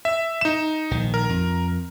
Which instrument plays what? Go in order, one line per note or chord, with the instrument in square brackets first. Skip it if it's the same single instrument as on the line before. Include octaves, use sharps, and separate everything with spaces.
[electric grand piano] E5
D#4 E7
[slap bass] A#1 D#3
[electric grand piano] A#4
[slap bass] F2